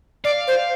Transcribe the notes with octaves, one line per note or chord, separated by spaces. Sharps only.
D5 F5
C5